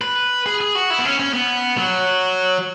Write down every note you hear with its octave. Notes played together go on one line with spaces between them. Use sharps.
B4
G#4
G#4
F#4
E4
B3
C#4
C#4
B3
F#3